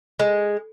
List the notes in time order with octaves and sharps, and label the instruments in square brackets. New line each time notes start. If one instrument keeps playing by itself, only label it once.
[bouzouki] G#3